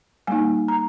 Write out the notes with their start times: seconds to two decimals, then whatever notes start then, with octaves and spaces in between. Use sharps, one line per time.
0.27 G3 A#3 D#4 G#5
0.68 A#5